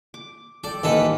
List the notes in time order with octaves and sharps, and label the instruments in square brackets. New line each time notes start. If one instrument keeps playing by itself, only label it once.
[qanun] D6
[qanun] A4 G5 [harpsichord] D5
[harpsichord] A1 A4 B4 [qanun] D#3 G#3 A#3